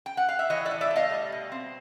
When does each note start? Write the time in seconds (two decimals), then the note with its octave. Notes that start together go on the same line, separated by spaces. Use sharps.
0.06 G5
0.17 F#5
0.29 F5
0.39 E5
0.50 E3 C#5 D#5
0.65 D5 E5
0.71 A2
0.81 D5 E5
0.90 A3
0.96 D#5 F5
1.11 G3
1.32 B2
1.52 C4